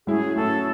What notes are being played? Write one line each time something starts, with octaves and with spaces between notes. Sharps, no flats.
A2 F#3 C#4 E4 G#4
A2 F#3 C#4 E4 A4